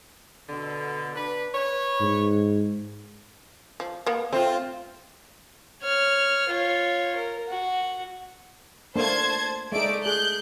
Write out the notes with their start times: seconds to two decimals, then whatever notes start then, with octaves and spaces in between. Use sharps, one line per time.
0.49 B2 D3
1.15 D4 B4
1.55 B4 C#5
2.01 G#2
3.80 F3
4.06 A#3 B3
4.33 A3 C4 F4
5.82 C#5 F6
6.49 F4 C#5
7.15 A#4
7.48 F#4
8.96 A3 A#3 D4 C5 A5 G#6
9.72 G#3 A3 D#4 D5 D7
10.06 G#4 F#6 G6